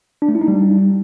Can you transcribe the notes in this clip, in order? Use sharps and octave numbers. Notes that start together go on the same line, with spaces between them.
D4
A3
E4
D#4
G3